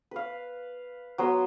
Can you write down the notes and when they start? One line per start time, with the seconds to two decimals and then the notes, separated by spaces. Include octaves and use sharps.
0.11 B4 F5
1.18 F#3 B3 C6